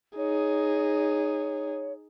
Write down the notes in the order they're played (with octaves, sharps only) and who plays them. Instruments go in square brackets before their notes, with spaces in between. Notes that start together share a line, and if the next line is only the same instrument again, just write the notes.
[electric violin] D#4 G#4 [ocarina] C#5